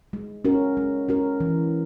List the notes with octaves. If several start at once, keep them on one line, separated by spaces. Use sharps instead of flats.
G#3
C#4 F#4 A#4
G#3
C#4 F#4 A#4
E3